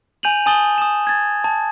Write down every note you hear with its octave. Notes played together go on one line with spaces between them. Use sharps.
G#5 G6 D#7 F7 F#7
G#5 A5 D#6 A6 F#7 G7
D#6 E7
G#6 A6
A5